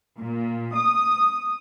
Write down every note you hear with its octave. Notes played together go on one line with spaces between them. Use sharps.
A#2
D#6